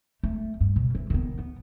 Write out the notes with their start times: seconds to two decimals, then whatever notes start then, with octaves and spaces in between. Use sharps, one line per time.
0.23 A3
0.61 G2
0.76 B2
0.95 E3
1.10 D#3 B3
1.39 B3